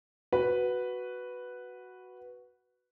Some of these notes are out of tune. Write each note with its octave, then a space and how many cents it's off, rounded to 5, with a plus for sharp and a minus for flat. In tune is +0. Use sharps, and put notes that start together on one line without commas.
F#4 +0 B4 +0